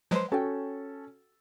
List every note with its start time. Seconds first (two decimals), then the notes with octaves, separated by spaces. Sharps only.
0.11 F3 F#3 G#3 B4 C5
0.32 C#4 F#4 A4 G5